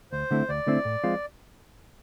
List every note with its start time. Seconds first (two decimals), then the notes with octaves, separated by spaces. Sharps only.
0.12 D2 C5
0.31 D3 A3 C4 E4
0.49 D2 D5
0.67 D3 A3 C4 E4
0.85 A2
1.03 F3 G#3 C4 F4